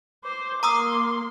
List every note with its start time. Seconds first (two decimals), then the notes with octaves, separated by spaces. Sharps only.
0.24 C5 D6
0.63 A#3 A#5 C6 D#6 E6